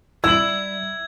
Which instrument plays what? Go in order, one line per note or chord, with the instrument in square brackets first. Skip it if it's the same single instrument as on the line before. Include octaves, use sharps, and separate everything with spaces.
[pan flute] G3 [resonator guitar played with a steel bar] E4 [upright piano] E6 F#7 [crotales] G#6